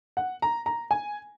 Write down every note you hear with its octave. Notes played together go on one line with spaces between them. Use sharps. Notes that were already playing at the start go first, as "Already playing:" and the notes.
F#5
A#5
A#5
G#5